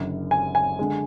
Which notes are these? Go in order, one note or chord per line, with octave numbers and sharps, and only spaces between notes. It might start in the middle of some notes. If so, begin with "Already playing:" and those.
Already playing: F#1 F#2 D3
G#5
G#5
D3 G#3